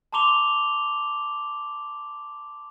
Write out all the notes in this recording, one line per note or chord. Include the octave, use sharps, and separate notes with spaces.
A5 A#5 C6 D6 F7 G7